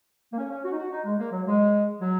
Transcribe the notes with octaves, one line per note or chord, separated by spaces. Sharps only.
A#3
C#4
C#4
F#4
D#4
F#4
D#4
G#3
A#3
F#3
G#3
F#3